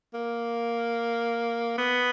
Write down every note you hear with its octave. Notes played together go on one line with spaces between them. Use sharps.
A#3
B3